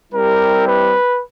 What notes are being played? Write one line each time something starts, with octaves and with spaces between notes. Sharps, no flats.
G3 C4 E4 G4 A#4
B4